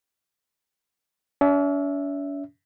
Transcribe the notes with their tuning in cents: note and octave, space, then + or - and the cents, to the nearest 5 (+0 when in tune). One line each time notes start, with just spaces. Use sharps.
C#4 +45 E5 +0